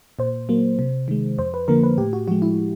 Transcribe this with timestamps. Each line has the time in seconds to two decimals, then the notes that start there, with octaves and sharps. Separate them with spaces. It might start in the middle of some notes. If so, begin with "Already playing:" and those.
0.19 A#2 C5
0.49 F#3 A#3
0.79 C3
1.08 D#3 G#3
1.38 F2 C5
1.54 B4
1.68 D3 F3 A#3 A#4
1.83 B4
1.98 A2 G4
2.13 F#4
2.28 F3 G#3 F#4
2.42 E4